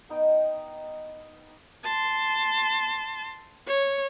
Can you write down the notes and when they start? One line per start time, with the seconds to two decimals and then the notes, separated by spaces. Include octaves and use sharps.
0.09 B3 D#4 D#5 G5
1.84 A5 C6
3.67 C#5